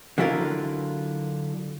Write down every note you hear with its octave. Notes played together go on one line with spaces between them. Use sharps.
D3 F#3 E4 F4 A#4